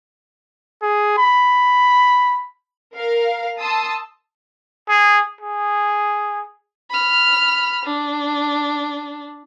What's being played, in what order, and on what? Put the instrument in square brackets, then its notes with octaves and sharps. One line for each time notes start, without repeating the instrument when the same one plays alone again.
[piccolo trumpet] G#4
B5
[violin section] A#4 F5
A5 C6 D#6 E6
[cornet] G#4
G#4
[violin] B5 F6
D4